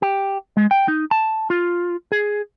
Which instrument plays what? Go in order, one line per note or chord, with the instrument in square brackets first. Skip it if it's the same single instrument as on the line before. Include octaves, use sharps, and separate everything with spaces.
[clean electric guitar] G4
G#3
G5
D#4
A5
F4
G#4